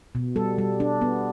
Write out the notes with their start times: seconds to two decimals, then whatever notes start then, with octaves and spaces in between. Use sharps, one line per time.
0.15 B2
0.36 G3 A4
0.58 G3
0.80 D4
1.01 B3